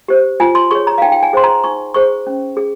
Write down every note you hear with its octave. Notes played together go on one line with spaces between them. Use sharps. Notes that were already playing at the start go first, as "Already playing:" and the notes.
G4 C5
F4 G#5
C6
G#4 C#5 C#6
A#5
F5
D#4 G5
G5
G#5
G#4 C5 C6
A#5
D#4 C#6
G#4 C5 C#6
C#4
G#4